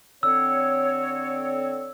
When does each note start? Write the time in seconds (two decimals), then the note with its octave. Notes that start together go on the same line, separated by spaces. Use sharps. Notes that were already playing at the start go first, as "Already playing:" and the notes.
0.23 D3 C4 C#5 E6